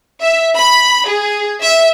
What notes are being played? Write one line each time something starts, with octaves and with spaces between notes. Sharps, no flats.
E5
B5
G#4
E5